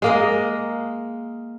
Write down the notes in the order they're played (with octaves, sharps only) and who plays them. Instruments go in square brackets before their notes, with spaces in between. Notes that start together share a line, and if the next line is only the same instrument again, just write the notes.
[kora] G#3 A#3 D#5